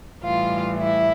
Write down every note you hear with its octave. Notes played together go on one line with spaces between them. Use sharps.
A2 E3 G3 F4 F5
E4 E5